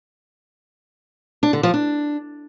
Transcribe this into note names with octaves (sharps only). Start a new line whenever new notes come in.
D4
D3
F3
D4